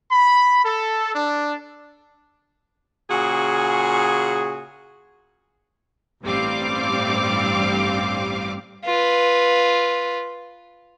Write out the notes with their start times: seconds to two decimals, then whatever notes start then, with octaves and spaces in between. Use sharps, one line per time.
0.10 B5
0.63 A4
1.14 D4
3.10 A#2 C#3 F#4 G#4
6.23 A1 G2 G3 C4 F5 D6
8.84 F4 B4